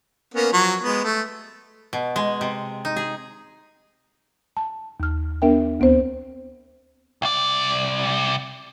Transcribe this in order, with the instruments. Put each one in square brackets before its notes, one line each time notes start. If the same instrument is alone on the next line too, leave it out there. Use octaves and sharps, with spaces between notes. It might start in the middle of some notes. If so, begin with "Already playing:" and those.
[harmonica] A#3 B3 C#4
F3 F#3 C#6
G#3 B3
A3
[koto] B2
G#3
C3
D#4
G#4
[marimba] A5
D#2 F6
B3 D4 A#4 E5 G5
D2 B3 C4 C5
[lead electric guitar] C2 D5